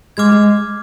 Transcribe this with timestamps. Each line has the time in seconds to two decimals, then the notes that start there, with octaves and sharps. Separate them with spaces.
0.17 G#3 D6 F6 G#6
0.32 G#3